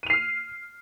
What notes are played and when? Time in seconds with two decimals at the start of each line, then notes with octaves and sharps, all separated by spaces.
0.03 D#7
0.07 F7
0.10 C7
0.13 F6